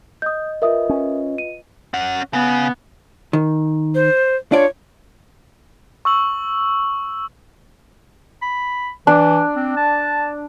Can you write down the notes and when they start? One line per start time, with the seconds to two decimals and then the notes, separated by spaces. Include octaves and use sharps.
0.22 D#5 D#6 G6
0.62 F4 A#4 B4 D#5 E5 D#6
0.89 C#4
1.38 D#7
1.94 C#4 F#5
2.33 C#3 B3
3.33 D#3
3.95 C5
4.52 D4 F4 C#5 D5
6.05 C#6 E6 F#7
8.42 B5
9.07 E3 D4
9.56 C4
9.77 A5